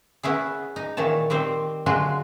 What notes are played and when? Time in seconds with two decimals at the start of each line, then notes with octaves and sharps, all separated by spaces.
0.23 B3 C#4 E4 G#4
0.76 D#4
0.97 A#2 D#3 E3 C#5 A5
1.30 D#3 G3 C4 C5
1.86 D3 F#3 G#3 F4 F#4 G#4